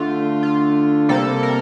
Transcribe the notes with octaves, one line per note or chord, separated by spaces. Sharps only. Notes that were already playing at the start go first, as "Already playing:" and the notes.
Already playing: D3 A3 F4
F4
C3 G3 A#3 A4
A#4